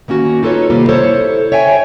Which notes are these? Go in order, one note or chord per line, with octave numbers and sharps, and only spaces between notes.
D#3 A#3 C#4 F#4
D#4 F4 A4 B4 C#5
C3 D#3 G3 A#3 F4
E4 A4 C5 C#5
C#5 E5 G5 G#5